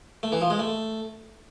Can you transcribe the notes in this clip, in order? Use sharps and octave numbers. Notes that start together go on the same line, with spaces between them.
A3
E3
F3
G#3
A3